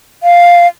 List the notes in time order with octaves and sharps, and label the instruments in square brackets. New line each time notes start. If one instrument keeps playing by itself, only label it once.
[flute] F5